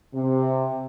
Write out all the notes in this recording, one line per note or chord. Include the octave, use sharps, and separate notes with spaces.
C3